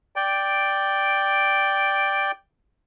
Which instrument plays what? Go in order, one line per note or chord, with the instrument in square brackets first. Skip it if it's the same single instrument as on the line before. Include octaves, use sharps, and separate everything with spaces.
[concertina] D5 G5